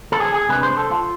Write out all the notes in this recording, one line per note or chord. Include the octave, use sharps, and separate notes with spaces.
A4
G#4
G#4
C3 G#3 D4 B4
C5
A4
F4